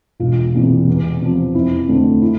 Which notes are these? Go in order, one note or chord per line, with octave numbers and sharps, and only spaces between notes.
E1 F4
E2 C3 E3 A#3
E2
C3 F3
F2 E4
D3 A3 C4
E4